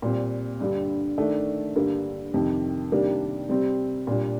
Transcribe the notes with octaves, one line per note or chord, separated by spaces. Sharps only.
A#2 G3 C4
G2 D3 G3
D#3 A3 D4
G2 D3 G3 A#3
F2 C3 D#3
C3 D#3 G3 A#3 D4
C3 G3 C4
A#2 G3 D4